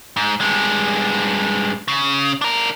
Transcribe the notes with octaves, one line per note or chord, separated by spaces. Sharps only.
G#2
G2 G#3
C#3
D4 A#4